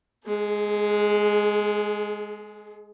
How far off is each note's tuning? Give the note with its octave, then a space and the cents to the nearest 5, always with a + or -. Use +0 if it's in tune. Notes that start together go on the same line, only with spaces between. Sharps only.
G#3 +0 G#4 +40